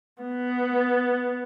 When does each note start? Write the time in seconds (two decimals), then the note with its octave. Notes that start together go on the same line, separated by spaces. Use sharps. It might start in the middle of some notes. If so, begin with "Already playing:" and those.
0.23 B3